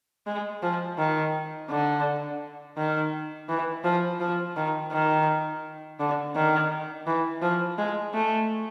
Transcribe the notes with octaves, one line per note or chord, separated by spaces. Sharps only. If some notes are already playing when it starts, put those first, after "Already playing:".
G#3
F3
D#3
D3
D#3
E3
F3
F3
D#3
D#3
D3
D#3
E3
F3
G#3
A3